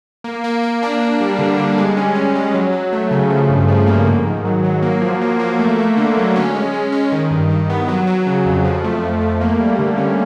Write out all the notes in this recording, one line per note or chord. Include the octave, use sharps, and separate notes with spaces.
A#3
A#3
A#3
D4
A#3
G3
D3
G3
G#3
C#4
C#4
G#3
F#3
F#3
A3
C#3
F3
G2
F3
A#3
G#2
D#3
F#3
F#3
A#3
F3
A#3
A#3
A3
A3
D3
F#3
C#4
G#3
G#3
C#4
D#3
G2
D#3
B3
F#3
F#3
C#3
F2
F3
A3
F2
A3
A#3
G3
D3
C#4